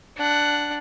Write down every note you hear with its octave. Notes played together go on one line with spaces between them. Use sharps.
D4 F#5